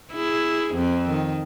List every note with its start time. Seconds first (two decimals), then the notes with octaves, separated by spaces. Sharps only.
0.13 E4 G#4
0.75 F2 C4
1.09 D#3